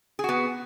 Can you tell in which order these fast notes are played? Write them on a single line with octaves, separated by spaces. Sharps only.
G#4 F#4 B3